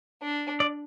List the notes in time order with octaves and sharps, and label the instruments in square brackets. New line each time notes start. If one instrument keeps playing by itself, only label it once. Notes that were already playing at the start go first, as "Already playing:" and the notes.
[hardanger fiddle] D4
[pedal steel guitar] D5